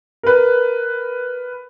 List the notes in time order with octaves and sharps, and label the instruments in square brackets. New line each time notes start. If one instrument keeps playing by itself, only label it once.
[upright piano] A#4 B4